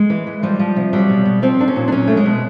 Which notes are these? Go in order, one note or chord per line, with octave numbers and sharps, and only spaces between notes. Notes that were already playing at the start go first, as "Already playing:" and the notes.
Already playing: G#3
E3
E3
F3 G3
F3
C3
F#3 G3
B2
B2
F3 C4
F3 D4
C#4
A#2
D4
F#3 C#4
F#3 A3
G#3
B2